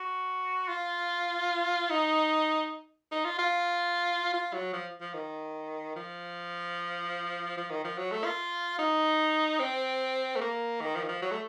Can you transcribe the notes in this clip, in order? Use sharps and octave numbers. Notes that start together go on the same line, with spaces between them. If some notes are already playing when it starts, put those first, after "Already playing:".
Already playing: F#4
F4
D#4
D#4
F4
F4
F4
F#3
F3
F3
D#3
F3
F3
D#3
F3
F#3
A3
F4
D#4
C4
A3
A#3
D#3
F3
D#3
F3
F#3
A3